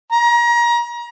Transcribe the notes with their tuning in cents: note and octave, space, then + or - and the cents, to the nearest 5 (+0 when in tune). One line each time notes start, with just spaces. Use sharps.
A#5 +30